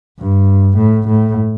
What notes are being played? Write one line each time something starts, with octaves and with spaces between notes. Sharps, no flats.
G2
A2
A2